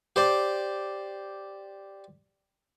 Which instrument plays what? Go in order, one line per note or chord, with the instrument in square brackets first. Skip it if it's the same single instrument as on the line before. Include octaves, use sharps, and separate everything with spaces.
[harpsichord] G4 C5 D5